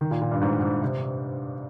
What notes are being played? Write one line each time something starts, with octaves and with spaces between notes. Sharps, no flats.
D#3
A#2
A#2
G2
G#2
G#2
C3